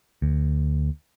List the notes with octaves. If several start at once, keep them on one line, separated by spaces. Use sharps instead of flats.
D2